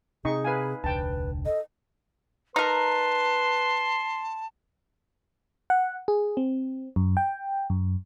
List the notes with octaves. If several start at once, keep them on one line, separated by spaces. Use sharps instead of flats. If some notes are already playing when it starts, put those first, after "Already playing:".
C3 D#4 G#4 C#6
B4 F5 G#5
E1 C#2 D4 B4 G5 A5
A4 D#5
D#4 A#4 B4 A5 C6
F#5
G#4
C4
F#2
G5
F#2